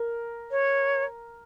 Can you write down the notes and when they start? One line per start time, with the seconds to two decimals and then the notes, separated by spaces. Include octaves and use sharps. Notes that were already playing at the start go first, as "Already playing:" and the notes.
Already playing: A#4
0.51 C#5